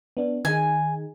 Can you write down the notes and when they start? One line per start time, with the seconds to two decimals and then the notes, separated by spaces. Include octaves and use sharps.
0.17 B3 D4
0.45 D#3 D#4 G#4 G#5